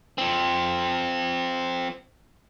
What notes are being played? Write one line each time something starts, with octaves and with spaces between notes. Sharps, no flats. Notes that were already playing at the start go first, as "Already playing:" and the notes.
F3 C4